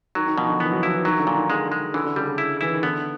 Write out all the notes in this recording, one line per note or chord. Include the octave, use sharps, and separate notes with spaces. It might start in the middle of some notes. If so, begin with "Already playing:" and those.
D#3 F#3
D#3
B2 F3
D3
E3 B3
F#3
F3 E4
E3
D#3 F#3
D3
A#2
D#3
D3 G#3
G#3
D3 E3
D3
C#3 G3
D3
E4
E3 E4
D#3
D3 B3